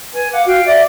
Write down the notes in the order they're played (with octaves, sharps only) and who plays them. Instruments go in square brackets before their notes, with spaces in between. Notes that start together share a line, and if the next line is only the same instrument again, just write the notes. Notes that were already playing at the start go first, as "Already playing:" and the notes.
[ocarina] B4 [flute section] G#5
[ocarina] F5 [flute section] F#5 D6
[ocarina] F#4 [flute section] F5 G5 F#6
[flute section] D5 [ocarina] E5